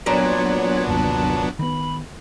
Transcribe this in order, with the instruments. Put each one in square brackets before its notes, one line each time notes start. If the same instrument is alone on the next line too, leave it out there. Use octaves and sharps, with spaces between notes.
[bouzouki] A#2 [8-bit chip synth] F#3 B3 D4 [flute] C#5
[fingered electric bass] G1 D#2 C3 [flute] A5
[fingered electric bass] D#3 B3 [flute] B5